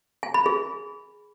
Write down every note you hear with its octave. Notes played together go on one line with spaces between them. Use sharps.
G#5
B5
G#4